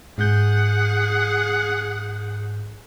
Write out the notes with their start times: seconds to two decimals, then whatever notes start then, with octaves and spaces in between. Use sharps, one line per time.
0.18 G#2 G#4 F#5 G6